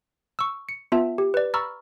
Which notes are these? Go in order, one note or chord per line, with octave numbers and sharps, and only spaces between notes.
C#6 E6
C#7
B3 F4 E5 A5
G4
B4 D5
A#5 B5 C#6 E6 F6 A6